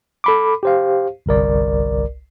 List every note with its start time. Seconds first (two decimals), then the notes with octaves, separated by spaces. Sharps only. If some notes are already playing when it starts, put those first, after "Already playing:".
0.24 A4 B5 D6
0.63 G4 C5 F5
1.26 G1 C2 A#4 D5